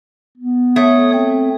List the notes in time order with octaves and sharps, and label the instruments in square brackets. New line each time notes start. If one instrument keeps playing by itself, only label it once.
[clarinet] B3
[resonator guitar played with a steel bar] A3 [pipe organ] C#5 D#6
[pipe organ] C4